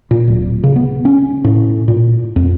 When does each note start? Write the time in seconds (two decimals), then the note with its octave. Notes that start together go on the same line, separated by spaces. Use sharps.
0.11 A#2
0.28 D1
0.64 C#3
0.76 B3
1.05 C#4
1.44 A2
1.88 A#2
2.36 F2